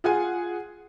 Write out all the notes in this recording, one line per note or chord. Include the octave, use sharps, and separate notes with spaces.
F4 G#4 F#5 G#5